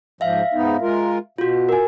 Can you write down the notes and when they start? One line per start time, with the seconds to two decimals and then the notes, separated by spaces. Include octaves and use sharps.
0.21 G#2 F3 E5 F5
0.54 G#2 B3 D#4
0.81 G#3 F4 A#4
1.38 B2 F4 F#4
1.69 A#4 G#5